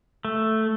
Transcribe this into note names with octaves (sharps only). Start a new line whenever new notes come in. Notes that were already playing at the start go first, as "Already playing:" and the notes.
A3